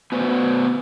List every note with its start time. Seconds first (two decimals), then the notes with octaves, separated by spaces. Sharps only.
0.12 B3 F#4 B4 C5 D5 G#5